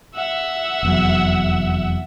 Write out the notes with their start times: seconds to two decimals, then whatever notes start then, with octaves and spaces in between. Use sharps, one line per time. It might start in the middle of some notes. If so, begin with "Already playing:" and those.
0.15 E5 F#5
0.83 F1 E2 F#3